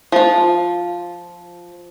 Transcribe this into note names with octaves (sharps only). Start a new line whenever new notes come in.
F3 F4